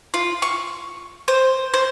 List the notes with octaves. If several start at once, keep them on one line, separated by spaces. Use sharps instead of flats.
F4
C#6
C5
C5